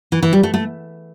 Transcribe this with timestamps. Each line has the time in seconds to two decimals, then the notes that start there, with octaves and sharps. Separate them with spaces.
0.12 E3
0.23 E3
0.33 G3
0.43 A3
0.54 A3